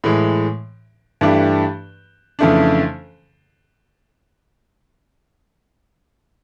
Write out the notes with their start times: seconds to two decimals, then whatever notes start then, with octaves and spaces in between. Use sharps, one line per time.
0.04 A2 E3 G#3
1.21 G2 E3 A3 D4 G4
2.39 F2 C#3 E3 A3 D4